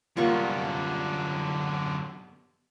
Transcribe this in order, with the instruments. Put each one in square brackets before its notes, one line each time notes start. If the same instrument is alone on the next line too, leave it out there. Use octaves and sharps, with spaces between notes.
[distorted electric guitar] F#2 D3 [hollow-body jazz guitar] G3 A#3 B3 [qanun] F4 C#5 C#6